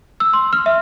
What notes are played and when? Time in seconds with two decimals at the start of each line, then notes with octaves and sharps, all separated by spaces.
0.20 E6
0.33 C6
0.53 F6
0.66 E5